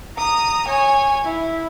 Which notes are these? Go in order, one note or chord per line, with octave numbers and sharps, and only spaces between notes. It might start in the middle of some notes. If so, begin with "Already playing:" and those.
A#5 D#6
C#5 G#5
E4